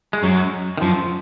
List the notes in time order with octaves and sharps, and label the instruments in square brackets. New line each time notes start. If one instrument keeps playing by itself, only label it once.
[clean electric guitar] G#3
[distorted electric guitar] F#2 [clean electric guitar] F#3
[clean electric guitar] D#3
[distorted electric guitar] F#2 [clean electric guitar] F3